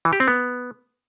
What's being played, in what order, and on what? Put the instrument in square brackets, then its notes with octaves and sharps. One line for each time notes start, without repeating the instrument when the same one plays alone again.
[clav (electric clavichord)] E3
G4
C4
B3